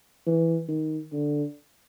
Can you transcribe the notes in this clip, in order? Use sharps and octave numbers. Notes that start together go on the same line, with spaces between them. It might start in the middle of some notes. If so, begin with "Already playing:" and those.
E3
D#3
D3